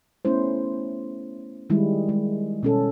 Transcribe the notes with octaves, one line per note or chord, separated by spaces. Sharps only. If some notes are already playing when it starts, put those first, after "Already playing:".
A3 B3 C#4 E4 C5
D#3 G3 G#3 E4
G#3
B2 C#4 A4